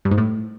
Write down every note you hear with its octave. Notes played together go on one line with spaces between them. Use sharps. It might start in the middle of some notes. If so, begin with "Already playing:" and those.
G2
G#2
A2